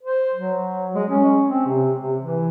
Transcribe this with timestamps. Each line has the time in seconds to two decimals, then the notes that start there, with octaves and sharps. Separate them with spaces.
0.03 C5
0.34 F#3
0.95 G#3
1.10 C#4
1.49 C4
1.67 C3
2.02 C3
2.20 E3